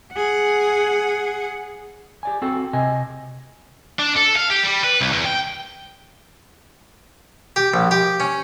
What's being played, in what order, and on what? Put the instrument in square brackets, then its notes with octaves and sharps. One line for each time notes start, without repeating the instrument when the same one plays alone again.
[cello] G#4 F#5
[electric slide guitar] G4 D5 G#5
C4 F#4 A4 G5
C3 D#5 G#5
[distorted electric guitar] D4
A4
F5
G4
G3
B4
C2
E2
G5
[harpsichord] G4
A#1
G4
C#4